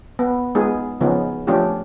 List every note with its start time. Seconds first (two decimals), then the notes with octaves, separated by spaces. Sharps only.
0.19 B3
0.55 G#3 B3 D#4 F4 G#4
1.01 C#3 F3 B3 C#4 D#4 F4
1.47 F3 A3 C#4 D4 F4 G4